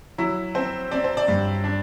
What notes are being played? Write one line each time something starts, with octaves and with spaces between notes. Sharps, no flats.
F#3 E4
C4 C5
C4 D5
C5
D5
G2
D4